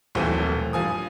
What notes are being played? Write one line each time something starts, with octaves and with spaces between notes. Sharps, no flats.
D#1 B1 E3 A3 C4 A4
G2 F3 G#5 D#6